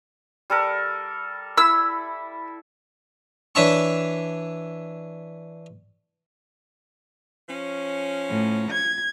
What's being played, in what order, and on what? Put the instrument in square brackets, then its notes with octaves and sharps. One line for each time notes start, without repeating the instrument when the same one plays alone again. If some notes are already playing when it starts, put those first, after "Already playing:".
[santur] G3 A4 A#4
[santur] E4 B5 [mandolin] E6
[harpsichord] E3 D4 C#5 E5 A5 C#6
[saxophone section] F3 C#4
[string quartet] A2
G#6